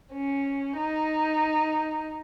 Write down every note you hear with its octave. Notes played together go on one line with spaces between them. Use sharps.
C#4
D#4